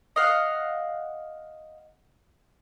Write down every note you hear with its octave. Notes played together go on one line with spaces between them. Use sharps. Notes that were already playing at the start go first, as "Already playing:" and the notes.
D#5 F5 F#5